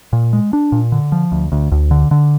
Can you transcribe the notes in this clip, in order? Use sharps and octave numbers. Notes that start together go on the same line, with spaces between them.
A#2
G#3
D4
A#2
D3
F3
D2
D2
D2
D3
D3